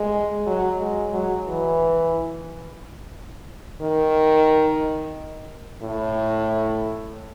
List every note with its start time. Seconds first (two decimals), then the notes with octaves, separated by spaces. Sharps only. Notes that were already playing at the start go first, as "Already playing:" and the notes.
Already playing: G#3
0.46 F#3
0.79 G#3
1.13 F#3
1.47 E3
3.82 D#3
5.82 A2